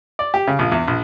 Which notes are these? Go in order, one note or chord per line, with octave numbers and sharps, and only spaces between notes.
D5
G4
C#3
A#1
E2
A#1